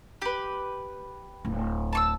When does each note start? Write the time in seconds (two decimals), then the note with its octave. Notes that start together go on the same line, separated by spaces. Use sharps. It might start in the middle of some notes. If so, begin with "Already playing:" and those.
0.22 G4 B4
1.45 D1
1.93 A5 C#6 E6